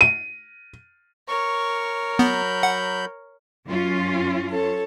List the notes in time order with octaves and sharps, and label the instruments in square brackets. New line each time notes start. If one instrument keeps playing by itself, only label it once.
[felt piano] D#7
[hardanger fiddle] A#4 C#5 [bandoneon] C#6
[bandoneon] F#3 B5 G6 [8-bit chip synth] B3
[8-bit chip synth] F#5
[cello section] F#2 C#4 F4
[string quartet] A4 C#5